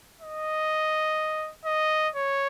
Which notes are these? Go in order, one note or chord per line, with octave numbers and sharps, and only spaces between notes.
D#5
D#5
C#5